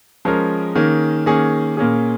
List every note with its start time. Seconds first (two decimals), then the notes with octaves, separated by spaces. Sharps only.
0.25 F3 G#3 C#4 A#4
0.75 D#3 A#3 C#4 G#4
1.26 D#3 A#3 C#4 G#4
1.77 A#2 A#3 C#4 G#4